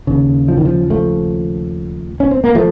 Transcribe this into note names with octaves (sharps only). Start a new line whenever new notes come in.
D#2 C#3
F3
D#3
F3
F3 A3
C#4
C4
A#3
F3 A3